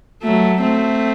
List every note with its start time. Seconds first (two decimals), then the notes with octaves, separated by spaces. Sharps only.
0.23 F#3 A3
0.62 A3 C4